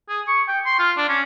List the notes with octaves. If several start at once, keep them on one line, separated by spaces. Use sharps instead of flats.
G#4
C#6
G5
C6
F4
D4
C#4